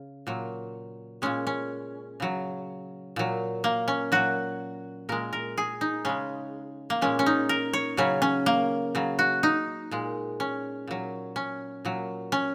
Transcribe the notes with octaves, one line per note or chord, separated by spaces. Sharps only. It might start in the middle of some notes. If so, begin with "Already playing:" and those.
Already playing: C#3
A#2 F#3
A#2 G#3 C#4
C#4
C#3 F#3
A#2 F#3
A#3
C#4
A#2 F#3 F#4
A#2 G#3 A#4
A#4
G#4
D#4
C#3 G#3 C#4
A#3
A#2 G#3 C#4
C#4
D#4
A#4
C#5
C#3 F#3 C#4
C#4
A#3
C#3 F#3
F#4
D#4
A#2 G#3
C#4
A#2 F#3
C#4
A#2 F#3
C#4